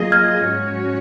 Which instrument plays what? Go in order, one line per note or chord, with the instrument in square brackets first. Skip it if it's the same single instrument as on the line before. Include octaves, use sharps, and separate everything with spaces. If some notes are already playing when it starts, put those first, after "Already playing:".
Already playing: [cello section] F#3 A#3 F4 G#4 D#5
[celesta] F6 G#6
[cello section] G#2 F#3 C#4 F#4 C#5